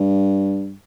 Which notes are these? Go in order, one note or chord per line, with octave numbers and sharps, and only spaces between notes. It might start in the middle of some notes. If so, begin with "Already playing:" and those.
Already playing: G2